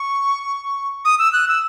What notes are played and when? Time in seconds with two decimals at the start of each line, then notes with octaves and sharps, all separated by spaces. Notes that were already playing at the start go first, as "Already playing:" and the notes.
Already playing: C#6
1.05 D#6
1.19 E6
1.33 F#6
1.48 E6